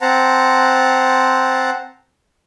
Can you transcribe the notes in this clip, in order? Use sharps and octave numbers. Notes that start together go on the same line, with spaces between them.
C4 C5 F#5 A5 A#5